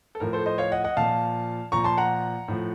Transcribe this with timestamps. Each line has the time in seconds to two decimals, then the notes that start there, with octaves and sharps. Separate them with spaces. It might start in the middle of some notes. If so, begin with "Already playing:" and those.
0.15 A4
0.20 A2 F3 A#4
0.33 A4 C5
0.46 C5 D#5
0.58 C#5 F5
0.72 D#5 F#5
0.84 D#5 F#5
0.97 A#2 F3 F5 A5
1.72 A#2 F3 A#5 C#6
1.84 A5 C6
1.98 F#5 A#5
2.48 A2 F3